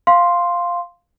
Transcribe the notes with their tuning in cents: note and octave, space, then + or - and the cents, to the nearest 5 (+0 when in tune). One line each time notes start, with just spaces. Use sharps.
F5 +0 C6 +0